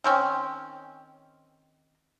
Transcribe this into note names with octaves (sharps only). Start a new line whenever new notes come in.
D#3 C4 C#4